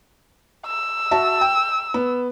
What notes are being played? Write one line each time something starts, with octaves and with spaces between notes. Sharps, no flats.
E6
F#4 E5 A5
G5
B3